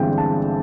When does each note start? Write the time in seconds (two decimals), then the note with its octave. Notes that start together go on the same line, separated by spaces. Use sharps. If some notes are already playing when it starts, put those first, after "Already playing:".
Already playing: G1 G2 E3 G#3 C4 G5
0.18 A5